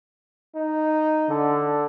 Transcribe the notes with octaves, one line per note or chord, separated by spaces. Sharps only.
D#4
D3